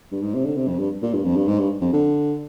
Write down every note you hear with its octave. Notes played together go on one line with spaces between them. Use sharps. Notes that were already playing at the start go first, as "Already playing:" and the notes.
G2
G#2
C3
D3
C3
F2
G2
A#2
G2
F2
G2
G#2
G2
F2
D3